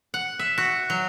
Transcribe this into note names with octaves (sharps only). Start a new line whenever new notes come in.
F#5
E5
F#4
F#3